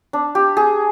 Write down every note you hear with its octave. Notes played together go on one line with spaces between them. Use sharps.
D4
G4
G#4